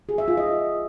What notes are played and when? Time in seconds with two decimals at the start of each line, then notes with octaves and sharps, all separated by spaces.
0.09 G#4
0.18 E5
0.28 F4
0.37 D#5